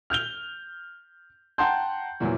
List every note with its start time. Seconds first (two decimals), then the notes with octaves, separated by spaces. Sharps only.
0.10 F6 G6 F7 G7
1.58 F#5 G5 A5 A#5 C6 G6
2.20 E2 A#2 E3 F#3